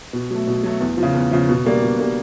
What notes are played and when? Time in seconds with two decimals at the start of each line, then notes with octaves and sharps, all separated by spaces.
0.13 B2
0.31 F#3 A3
0.48 B2
0.64 F#3 A3
0.81 E2
0.97 F3
1.03 C#3
1.14 E2
1.31 C#3 F3
1.49 B2
1.66 G3 A#3 D4
1.83 B2
1.99 G3 A#3 D4